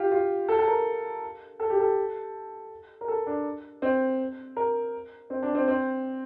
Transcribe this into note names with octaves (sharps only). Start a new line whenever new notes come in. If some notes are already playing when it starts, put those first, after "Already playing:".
Already playing: F4 G4
F4
A4
A4
A#4
A4
G4
A4
A#4
A4
D4
C4
A#4
C4
D4
C4
C4